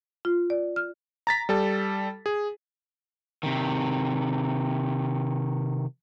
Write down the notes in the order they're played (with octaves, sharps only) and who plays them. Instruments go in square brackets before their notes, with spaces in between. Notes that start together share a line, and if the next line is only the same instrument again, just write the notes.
[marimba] F4
D5
F6
[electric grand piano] A#5 A6 B6
G3 A4 A5
G#4
[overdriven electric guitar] C3 D#3